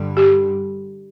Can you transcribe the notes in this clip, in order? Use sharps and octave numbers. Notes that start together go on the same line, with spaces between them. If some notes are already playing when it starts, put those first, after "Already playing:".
Already playing: G2 D3 G3
G4